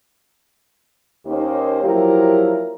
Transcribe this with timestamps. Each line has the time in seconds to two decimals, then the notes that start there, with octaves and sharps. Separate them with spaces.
1.26 D#2 A#3 C#4 D#4 G4 C5
1.83 F3 F#3 A#3 E4 G4 A#4